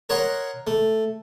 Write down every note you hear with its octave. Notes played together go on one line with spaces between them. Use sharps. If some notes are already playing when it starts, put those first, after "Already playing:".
A#4 C#5 D#5 F#5 C6
A3